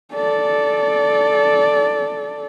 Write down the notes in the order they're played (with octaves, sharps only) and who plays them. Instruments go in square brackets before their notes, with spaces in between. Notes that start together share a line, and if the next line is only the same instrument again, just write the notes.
[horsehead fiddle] A4 D5